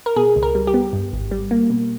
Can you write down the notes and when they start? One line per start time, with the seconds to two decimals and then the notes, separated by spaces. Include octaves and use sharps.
0.06 A#4
0.16 B2 G#4
0.36 C#2
0.43 A#4
0.55 G3
0.67 G4
0.74 B3
0.93 G2
1.13 G#1
1.31 G3
1.51 A#3
1.70 B2